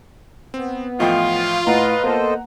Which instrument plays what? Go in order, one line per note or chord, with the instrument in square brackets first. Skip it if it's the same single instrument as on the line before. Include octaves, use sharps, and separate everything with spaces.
[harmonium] B3 [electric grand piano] C4
[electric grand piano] A2 E3 F3 [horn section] F4 [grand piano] D#5 G5
[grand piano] A2 [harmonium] B4 D#5 [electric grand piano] F#5 A#5
[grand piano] A#3 B3 [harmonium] A4 C5 D#5